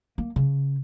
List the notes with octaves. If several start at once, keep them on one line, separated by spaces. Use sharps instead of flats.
A#3
C#3